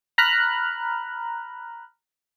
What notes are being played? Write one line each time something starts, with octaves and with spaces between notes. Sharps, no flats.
A#5 B5 F6 F#6